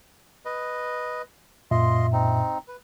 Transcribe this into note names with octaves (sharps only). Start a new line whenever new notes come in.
B4 D#5
F#2 A#2 F4 D#5 E5 C6
C4 D#4
B4